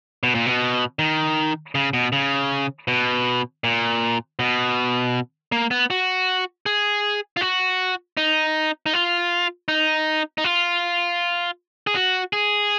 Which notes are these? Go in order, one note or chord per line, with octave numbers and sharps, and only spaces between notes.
B2
A#2
B2
D#3
C#3
B2
C#3
B2
A#2
B2
A#3
B3
F#4
G#4
F4
F#4
D#4
D#4
F4
D#4
D#4
F4
G#4
F#4
G#4